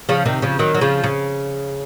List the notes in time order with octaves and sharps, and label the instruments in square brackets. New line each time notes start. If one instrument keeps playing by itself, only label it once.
[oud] C#3 F3
C3 D#3
C#3 F3
D#3 F#3
F#3
C#3 F3
C#3